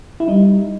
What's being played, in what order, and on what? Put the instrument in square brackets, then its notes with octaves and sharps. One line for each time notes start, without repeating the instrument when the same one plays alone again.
[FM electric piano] E4
[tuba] G3 [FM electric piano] D#4